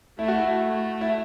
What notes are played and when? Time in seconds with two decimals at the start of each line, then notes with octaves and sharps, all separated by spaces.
0.19 A3 E4
0.28 F#4
0.38 E4
0.64 A3
1.01 E4